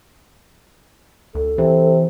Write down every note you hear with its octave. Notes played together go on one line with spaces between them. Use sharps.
D2 A4
C3 E3